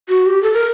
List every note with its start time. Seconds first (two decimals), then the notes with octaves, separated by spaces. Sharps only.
0.09 F#4
0.26 G4
0.43 A4
0.54 A#4